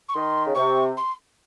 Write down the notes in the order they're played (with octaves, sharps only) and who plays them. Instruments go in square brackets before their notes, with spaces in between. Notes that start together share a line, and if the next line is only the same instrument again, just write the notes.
[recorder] C#6
[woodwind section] D#3 [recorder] C6
[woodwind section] C#3
[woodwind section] C3 [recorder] C#6
[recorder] C6